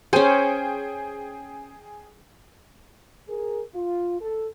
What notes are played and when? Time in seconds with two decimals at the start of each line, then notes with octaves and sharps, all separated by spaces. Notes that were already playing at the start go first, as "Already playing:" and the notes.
0.13 C#4 G#4 C5 G5 D#7
3.28 G#4 A#4
3.74 F4
4.20 A4